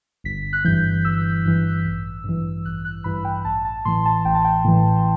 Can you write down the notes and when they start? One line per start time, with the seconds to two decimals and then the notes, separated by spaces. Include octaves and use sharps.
0.24 G1 B6
0.53 F#6
0.64 G2 E3 G6
1.05 G1 E6
1.45 G2 E3
1.85 A1
2.24 G2 E3
2.65 A1 F#6
2.85 F#6
3.04 G2 E3 B5
3.25 G5
3.45 A1 A5
3.65 A5
3.85 A2 E3 C6
4.06 A5
4.25 A1 G5
4.35 A5
4.45 G5
4.64 A2 E3